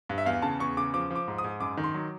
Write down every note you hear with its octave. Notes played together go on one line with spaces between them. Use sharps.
G2
E5
E2 F5
C#3 A5
E2 C#6
C#3 D6
F3 D6
F3
D6
G#2
D#6
G#2
F#2 D6
D#3
C6
F#3